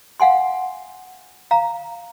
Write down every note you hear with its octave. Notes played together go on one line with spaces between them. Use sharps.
F5 F#5 G#5 C6
F5 A#5